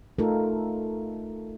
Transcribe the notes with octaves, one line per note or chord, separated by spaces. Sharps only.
A3 D#4 F4 A4 A#4